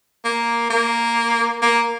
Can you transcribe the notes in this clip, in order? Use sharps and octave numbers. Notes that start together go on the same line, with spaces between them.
A#3
A#3
A#3